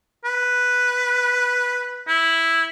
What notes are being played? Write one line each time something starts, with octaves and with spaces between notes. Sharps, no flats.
B4
E4